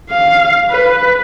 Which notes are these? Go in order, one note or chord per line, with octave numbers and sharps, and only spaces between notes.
F5
B4